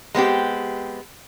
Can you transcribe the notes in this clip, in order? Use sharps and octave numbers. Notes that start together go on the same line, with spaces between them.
G#3 B3 C4 G4